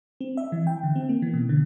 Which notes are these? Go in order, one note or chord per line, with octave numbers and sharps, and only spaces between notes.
C4
E5
E3
G5
D3
C4
A#3
E3
B2
D3